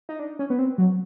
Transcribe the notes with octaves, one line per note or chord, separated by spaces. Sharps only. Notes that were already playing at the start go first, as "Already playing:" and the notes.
D#4
D4
C#4
B3
C4
F#3